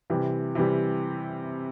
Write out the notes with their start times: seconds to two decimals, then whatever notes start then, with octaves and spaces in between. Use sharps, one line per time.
0.10 C3 E3 G3
0.55 C3 E3 G3